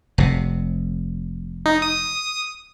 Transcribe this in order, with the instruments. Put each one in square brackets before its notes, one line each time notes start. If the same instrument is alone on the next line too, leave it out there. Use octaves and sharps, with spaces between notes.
[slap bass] F1 C3
[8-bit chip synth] D#4
D#6